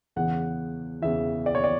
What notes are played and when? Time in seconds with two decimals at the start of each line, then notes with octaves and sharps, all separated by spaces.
0.16 E2 C#3 E3 F#5
1.02 E2 C#3 E3 E5
1.46 D5
1.55 C#5
1.64 D5